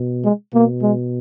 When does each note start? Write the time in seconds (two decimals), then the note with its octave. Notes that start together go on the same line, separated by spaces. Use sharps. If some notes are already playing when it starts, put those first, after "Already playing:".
Already playing: B2
0.23 G#3
0.53 B2 A#3
0.83 G#3